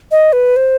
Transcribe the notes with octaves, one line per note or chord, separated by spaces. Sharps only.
D#5
B4
C5